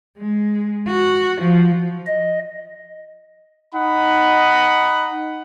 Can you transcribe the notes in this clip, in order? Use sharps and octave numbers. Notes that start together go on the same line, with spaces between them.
G#3
F#4
F3
D#5
D#4 D#5 F#5 B5